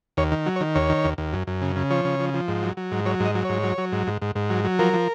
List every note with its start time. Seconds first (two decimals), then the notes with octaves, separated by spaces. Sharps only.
0.17 D#2 C#5
0.32 D#3
0.46 F#3
0.56 C#5
0.61 D#3
0.75 D#2 C#5
0.90 D#3
1.04 D#2
1.18 D#2
1.33 F#2
1.47 F#2
1.62 C#3
1.76 C#3
1.90 F3 C#5
2.05 C#3
2.20 F3
2.34 F3
2.48 G#2
2.63 F#3
2.77 F#3
2.91 G#2
3.05 F#3 C#5
3.20 G#2
3.25 D#5
3.35 F#3
3.45 G#2 C#5
3.63 F#3
3.78 F#3
3.92 G#2
4.07 G#2
4.22 G#2
4.35 G#2
4.50 F#3
4.64 F#3
4.79 F3 A#4
4.93 F3